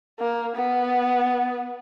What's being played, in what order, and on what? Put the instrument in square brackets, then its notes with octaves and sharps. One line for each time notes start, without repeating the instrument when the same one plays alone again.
[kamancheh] A#3
B3